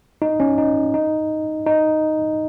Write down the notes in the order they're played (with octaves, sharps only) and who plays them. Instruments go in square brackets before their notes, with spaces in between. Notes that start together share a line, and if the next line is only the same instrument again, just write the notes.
[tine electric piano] D#4
C#4
D#4
D#4
D#4